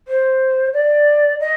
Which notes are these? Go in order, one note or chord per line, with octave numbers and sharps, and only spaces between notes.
C5
D5
D#5